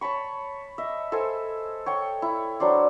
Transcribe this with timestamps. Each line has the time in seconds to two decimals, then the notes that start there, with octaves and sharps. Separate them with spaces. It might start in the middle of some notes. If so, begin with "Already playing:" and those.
0.01 C#5 A5 B5 C#6
0.78 D#5 E5
1.12 A4 B4 C5 G#5
1.86 C#5 G5 C#6
2.22 E4
2.60 F#3 D4 C5 D5